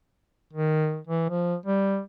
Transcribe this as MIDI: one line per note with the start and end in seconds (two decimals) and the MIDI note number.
0.53 0.99 51
1.07 1.25 52
1.30 1.55 53
1.66 2.00 55